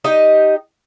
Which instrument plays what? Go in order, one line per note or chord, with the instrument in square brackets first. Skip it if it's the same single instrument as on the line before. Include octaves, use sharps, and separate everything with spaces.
[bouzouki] D#4 G4 D#5